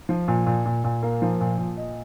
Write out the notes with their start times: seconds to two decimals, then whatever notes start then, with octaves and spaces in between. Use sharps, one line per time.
0.09 F3
0.28 A#2
0.47 A#2
0.66 A#2
0.84 A#2
1.03 A#3
1.22 F3
1.41 A#2
1.58 A#2
1.78 D#5